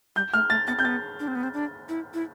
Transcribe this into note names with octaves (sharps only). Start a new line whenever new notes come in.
G3 G6
A3 F6
A3 A6
B3 A6
C4 G6
B3 A6
D4
C4
B3
C4
D4
E4
E4